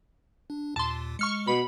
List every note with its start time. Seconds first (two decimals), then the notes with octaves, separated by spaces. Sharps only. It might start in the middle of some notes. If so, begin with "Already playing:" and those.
0.50 D4
0.76 D#2 A#2 A5 C6
1.19 G#3 C#6 F6 C#7
1.47 B2 B5